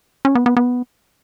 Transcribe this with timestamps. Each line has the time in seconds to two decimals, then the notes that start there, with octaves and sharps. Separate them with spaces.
0.25 C#4
0.35 B3
0.46 B3
0.57 B3